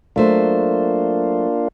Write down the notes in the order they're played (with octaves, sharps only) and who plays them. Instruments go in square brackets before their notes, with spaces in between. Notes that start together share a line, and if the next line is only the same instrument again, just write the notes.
[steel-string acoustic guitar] F#3 A3 C5 [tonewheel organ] A#3 D4 F4